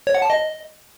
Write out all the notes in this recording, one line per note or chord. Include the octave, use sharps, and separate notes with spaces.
C#5
F#5
A5
D#5